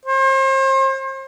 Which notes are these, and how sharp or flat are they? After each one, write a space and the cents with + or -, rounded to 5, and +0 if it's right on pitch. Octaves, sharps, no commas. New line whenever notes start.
C5 +40